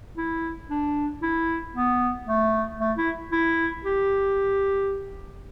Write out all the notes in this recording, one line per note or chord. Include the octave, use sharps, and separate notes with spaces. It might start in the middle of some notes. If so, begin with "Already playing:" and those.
E4
D4
E4
B3
A3
A3
E4
E4
G4